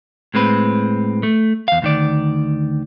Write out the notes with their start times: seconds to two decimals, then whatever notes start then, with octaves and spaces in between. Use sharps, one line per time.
0.34 A2 G#3 C4 B4
1.23 A3
1.68 E2 F5
1.82 D2 D#3 D5